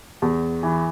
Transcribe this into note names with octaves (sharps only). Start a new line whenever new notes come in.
E2
E3